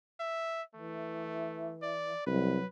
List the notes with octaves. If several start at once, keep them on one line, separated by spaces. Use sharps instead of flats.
E5
E3 A3
D5
C2 F#3 B4